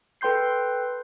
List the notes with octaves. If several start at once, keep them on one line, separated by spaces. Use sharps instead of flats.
A4 B4 G5 C6 G6 C7